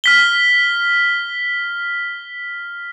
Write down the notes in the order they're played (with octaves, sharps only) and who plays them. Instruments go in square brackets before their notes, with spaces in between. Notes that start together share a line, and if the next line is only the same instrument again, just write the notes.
[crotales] F6 B6 G7